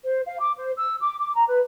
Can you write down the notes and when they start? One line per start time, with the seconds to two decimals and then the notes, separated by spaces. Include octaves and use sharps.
0.05 C5
0.27 F5
0.39 D6
0.57 C5
0.78 E6
1.01 D6
1.19 D6
1.36 A#5
1.48 B4